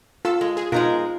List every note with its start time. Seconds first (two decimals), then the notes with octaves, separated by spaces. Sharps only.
0.25 F4 A4 E6
0.41 G#3
0.57 G#4
0.72 B2 G#3 D#4 F4 A#4